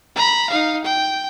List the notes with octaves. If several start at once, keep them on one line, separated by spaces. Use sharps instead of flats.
A#5 B5
D#4 F5
G5